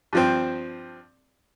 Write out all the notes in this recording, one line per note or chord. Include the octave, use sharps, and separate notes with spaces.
G2 F3 C4